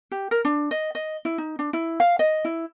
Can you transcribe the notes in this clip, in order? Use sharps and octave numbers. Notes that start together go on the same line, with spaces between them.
G4
A#4
D4
D#5
D#5
E4
D#4
D4
E4
F5
D#5
E4